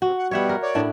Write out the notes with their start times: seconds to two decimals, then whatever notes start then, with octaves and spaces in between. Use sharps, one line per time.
0.02 C3 F#4
0.18 F#5
0.31 B2 G3 C#5 E5 F#5
0.49 A#4
0.63 C#5 D5
0.75 A2 D4 E4